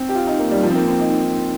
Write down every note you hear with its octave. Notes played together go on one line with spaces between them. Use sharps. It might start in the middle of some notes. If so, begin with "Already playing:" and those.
Already playing: C4
G4
F4
D#4
A#3
G3
F3
C4
A#3
C4
D#4